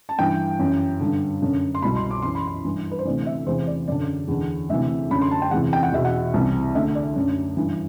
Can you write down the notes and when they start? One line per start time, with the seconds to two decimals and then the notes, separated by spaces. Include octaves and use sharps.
0.09 A5
0.19 G2 E3 G5
0.59 F#2 E3
1.01 G2 D3
1.42 F#2 D3
1.75 C6
1.82 B2 B5
1.85 C2
1.96 C6
2.11 D6
2.22 F#2 E3 C6
2.35 B5
2.47 C6
2.65 G2 E3
2.91 B4
2.99 C5
3.05 D2 C3 E3 D5
3.26 E5
3.46 E2 C3 E3 C5
3.67 D5
3.88 F#2 D3 D5
4.28 E2 D3
4.69 D2 C3 E3 E5
5.11 F#2 D3 B5
5.22 C6
5.31 A5
5.42 G5
5.51 E2 C3 E3 F#5
5.73 G5
5.83 F#5
5.93 E2 B2 E5
6.05 F#5
6.34 C2 C3 E3
6.75 D2 D3 E5
6.95 D5
7.16 F#2 D3
7.57 G2 E3